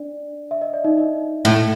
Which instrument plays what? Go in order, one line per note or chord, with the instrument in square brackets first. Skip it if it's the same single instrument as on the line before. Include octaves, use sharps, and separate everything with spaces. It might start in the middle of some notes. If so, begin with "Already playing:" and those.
Already playing: [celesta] D4 D5
E5
D#5
D5
D#4 D#5
D#4 D#5
[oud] A2 [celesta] E4 E5